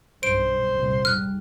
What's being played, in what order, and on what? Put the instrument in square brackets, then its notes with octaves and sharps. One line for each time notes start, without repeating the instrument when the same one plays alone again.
[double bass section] B1 G2 [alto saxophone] C5 [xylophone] D7
[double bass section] F1 C2 A#2
[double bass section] G#2 G3 [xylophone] F6 F#6